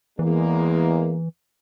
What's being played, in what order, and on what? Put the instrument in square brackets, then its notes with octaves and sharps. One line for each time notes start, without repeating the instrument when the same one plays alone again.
[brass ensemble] E2 G#3 A#3 [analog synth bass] E3